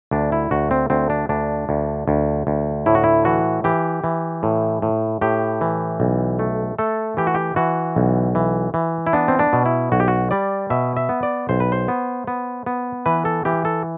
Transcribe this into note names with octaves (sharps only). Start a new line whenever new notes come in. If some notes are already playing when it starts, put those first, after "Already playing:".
D2 D4
E4
D2 F#4
C4
D2 C4
D4
D2 D4
D2
D2
D2
A2 E4
F#4
E4
E3 F#4
E3 G4
E3
A2
A2
A2 G4
E3
B1
A3
A3 A4
E3 G4
F#4
G4
E3 F#4
B1
E3
E3
E4
B3 D4
C4
D4
B2
E4
B1 F#4
G4
F#4
G3 D5
B2 E5
E5
B3
D5
B1 C5
B4
C5
B3
B3
B3
E3 B4
A4
E3 G4
A4